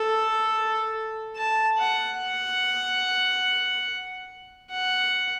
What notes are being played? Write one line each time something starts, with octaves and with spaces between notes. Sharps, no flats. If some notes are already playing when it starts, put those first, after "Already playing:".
Already playing: A4
A5
F#5
F#5
F#5